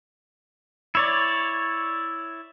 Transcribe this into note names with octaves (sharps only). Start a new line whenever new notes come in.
E4 C#5 D5